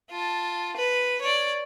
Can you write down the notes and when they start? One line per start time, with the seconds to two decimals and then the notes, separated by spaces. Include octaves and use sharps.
0.11 F4 A5
0.77 B4
1.22 C#5 D5